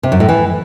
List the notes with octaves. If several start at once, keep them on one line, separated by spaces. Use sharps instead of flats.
C3
F#2
A2
E3